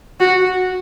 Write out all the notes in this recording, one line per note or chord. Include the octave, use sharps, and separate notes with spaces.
F#4